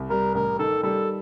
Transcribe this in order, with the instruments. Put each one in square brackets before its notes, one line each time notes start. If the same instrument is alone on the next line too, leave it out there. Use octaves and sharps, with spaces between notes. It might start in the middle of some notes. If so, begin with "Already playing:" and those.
Already playing: [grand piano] C2
[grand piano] G3 [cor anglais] A#4
[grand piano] A1 [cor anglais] A#4
[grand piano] D#3 [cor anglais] A4
[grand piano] G3 [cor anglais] A4